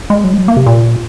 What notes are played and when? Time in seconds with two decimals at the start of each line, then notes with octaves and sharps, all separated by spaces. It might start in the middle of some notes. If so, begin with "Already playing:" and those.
0.10 G#3
0.24 F#3
0.34 G#3
0.38 F#3
0.48 A#3
0.57 C3
0.66 A#2